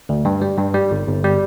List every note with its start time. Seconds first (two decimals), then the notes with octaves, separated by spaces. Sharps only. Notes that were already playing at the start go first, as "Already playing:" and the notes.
0.09 D2
0.25 G2
0.42 G3
0.58 G2
0.74 G3
0.91 G1
1.07 G1
1.24 G3